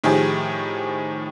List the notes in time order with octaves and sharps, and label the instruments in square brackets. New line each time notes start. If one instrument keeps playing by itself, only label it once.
[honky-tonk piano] A2 D#3 F3 G4 G#4